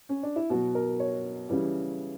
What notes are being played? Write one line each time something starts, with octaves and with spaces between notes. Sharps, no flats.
C#4
D4
E4
B2 F#3 F#4
A#4
C#5
C#3 E3 G3